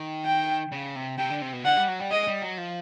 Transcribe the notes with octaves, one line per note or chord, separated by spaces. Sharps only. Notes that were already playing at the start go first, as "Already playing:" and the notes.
Already playing: D#3
G5
C#3
C3
C3 G5
D3
C3
B2
D3 F#5
G3
F#3
G3
G#3 D#5
G3
F#3
F3